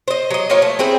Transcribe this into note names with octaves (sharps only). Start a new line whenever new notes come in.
C5 D#5
F#3 D#5
A#3 C#4 F4 C#5
A3
C4 E4 G#4 C5